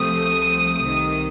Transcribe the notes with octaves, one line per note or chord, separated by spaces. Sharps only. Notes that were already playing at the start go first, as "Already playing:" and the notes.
Already playing: C2 C3 F3 A3 C4 D#6
C2 C3 D#3